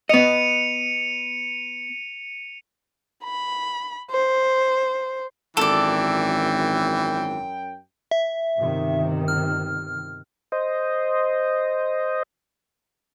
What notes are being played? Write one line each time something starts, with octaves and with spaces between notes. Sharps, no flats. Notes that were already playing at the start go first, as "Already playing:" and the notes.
B3 D#5 C#7 D#7 F7
B5
C5
G#1 F#2 E3 A4 D5 G5
E5
G1 C3 D#3
F6
C5 D#5